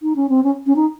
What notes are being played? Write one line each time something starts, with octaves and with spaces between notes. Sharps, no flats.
D#4
C#4
C4
C#4
C#4
D#4